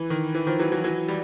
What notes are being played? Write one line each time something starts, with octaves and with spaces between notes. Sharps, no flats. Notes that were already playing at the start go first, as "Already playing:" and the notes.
Already playing: E3
D#3
E3
D#3 F3
E3 F#3
E3 F#3
E3 F#3
G3